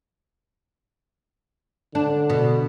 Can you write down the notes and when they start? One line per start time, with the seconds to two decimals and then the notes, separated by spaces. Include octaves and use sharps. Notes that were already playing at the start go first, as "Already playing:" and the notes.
1.95 D3 D4
2.30 B2